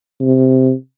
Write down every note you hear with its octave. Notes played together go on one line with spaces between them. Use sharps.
C3